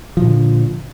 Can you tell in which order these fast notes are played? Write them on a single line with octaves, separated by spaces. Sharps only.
F3 A#2 D3